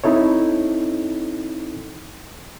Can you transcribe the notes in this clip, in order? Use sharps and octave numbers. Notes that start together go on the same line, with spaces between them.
C4 D#4 E4 A4 C#5